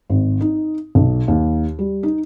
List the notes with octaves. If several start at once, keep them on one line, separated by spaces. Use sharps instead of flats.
G#1
D#4
B1
D#2
G3
D#4